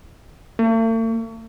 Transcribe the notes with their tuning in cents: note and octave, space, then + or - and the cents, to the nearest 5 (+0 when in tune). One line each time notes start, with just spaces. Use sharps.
A3 +45